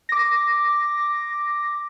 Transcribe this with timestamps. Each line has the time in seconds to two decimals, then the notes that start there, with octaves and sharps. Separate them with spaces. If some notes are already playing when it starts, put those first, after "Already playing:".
0.09 D6 A#6